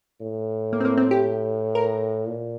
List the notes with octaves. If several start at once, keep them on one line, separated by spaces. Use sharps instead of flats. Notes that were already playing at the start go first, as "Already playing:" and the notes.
A2
A#3
C4
A#3
C4
G4
A#4
A#2